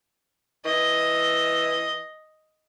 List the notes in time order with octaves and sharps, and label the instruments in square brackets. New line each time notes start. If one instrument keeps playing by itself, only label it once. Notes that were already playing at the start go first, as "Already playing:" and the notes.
[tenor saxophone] E3 [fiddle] D#5